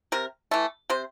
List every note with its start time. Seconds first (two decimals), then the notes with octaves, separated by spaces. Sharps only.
0.12 C3 A#4
0.51 E3 A3
0.90 C3 C5